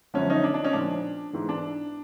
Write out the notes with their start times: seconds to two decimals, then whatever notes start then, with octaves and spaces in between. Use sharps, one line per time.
0.14 F#2 D3 F3 C#4
0.30 C#4 D#4
0.44 D4
0.54 D4
0.64 C#4 D#4
0.73 A#2 F3 D4
1.33 G#2 E3
1.49 D4